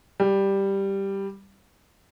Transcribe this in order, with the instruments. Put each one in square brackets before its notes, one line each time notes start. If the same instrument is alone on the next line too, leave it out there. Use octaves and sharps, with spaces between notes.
[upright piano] G3